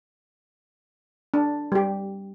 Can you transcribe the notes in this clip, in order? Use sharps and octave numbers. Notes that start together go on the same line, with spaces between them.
D4
G3 G4